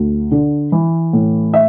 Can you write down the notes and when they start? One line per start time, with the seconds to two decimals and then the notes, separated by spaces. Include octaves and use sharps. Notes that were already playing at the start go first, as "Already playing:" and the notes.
Already playing: D2
0.31 D3
0.72 E3
1.13 A2
1.54 E5